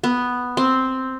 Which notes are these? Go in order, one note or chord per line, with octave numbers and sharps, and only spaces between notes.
B3
C4